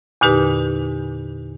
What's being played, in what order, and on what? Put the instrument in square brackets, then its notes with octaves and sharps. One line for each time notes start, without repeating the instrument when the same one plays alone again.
[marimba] E2 A#2 D3 D#4 G4 B4